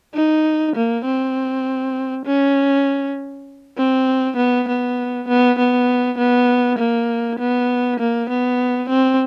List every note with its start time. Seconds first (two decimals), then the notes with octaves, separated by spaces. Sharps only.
0.14 D#4
0.76 A#3
1.06 C4
2.26 C#4
3.78 C4
4.37 B3
4.68 B3
5.29 B3
5.59 B3
6.18 B3
6.79 A#3
7.39 B3
8.00 A#3
8.30 B3
8.90 C4